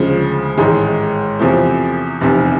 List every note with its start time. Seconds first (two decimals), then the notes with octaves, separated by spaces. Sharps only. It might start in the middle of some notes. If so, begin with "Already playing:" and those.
Already playing: D2 C#3 F3 G#3
0.58 A1 G#2 D#3 G#3
1.39 E2 C3 F3 A3
2.21 F1 E2 C3